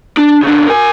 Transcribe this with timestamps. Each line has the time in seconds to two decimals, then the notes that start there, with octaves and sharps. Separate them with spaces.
0.17 D4
0.43 C#3 D4
0.66 A#4 G#5